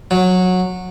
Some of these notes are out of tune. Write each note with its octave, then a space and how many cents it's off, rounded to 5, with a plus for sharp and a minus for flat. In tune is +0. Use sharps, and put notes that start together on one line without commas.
F#3 -15